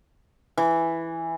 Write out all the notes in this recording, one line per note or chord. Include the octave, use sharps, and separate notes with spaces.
E3